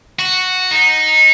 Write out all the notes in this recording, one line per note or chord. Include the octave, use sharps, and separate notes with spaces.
F#4
D#4